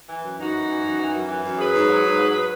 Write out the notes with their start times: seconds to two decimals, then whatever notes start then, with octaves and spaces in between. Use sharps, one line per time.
0.09 E3
0.24 F#2
0.38 E3 D#4 F#4
0.53 F#2
0.68 E3
0.83 F#2
0.98 E3
1.14 F#2
1.28 E3
1.43 F#2
1.58 F#3 G#4 B4
1.74 G#2
1.89 F#3
2.04 G#2
2.19 F#3